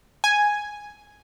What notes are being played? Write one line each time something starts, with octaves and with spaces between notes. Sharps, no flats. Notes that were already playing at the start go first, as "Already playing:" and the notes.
G#5